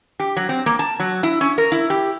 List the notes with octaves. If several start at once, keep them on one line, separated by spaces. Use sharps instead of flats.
G4
F#3
C4
A#3
A5
F#3
E4
C#4
A#4
E4
G4